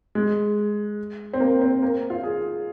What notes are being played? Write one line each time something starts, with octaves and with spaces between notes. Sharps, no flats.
G#3
C4
A#3
C4
A#3
F4
G#4